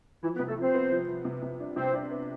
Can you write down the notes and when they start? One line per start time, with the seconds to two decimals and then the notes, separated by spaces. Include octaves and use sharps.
0.23 E3 F3 E4
0.36 B3 B4
0.39 C3
0.48 A3 A4
0.58 F3 C4 C5
0.74 B3
0.92 F3
1.08 F3
1.25 C3
1.42 C3
1.60 D4
1.76 C3 C4 C5
1.93 D4
2.11 B3